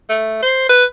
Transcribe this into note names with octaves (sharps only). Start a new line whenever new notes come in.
A3
C5
B4